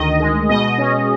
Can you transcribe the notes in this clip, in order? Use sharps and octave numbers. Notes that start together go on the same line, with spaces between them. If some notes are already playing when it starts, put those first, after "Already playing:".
Already playing: D2 D#3 D#5
G#3
B2 D#5
C#4